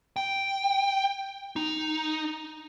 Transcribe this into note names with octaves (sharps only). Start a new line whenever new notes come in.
G5
D#4